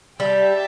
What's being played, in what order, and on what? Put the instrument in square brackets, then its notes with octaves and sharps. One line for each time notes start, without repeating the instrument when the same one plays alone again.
[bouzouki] G3 [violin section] G4 E5 A5